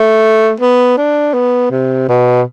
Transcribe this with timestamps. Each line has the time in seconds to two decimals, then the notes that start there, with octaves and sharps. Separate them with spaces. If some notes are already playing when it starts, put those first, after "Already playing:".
Already playing: A3
0.60 B3
0.98 D4
1.34 B3
1.71 C3
2.09 B2